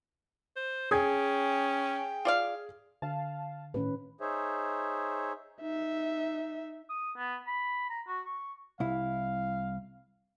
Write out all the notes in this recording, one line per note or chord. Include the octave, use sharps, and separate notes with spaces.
C5
C#4 G#4 G5 D#6 G#6
F4 D5 F5
D3 F5 A5
A2 D#3 C#4 B4
D#4 G#4 C5 C#5 E5
D#4 E5
D#6
B3
B5
A#5
F#4
C#6
C2 E4 F5